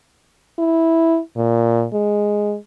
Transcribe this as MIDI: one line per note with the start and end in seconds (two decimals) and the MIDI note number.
0.59 1.19 64
1.36 1.86 46
1.93 2.57 56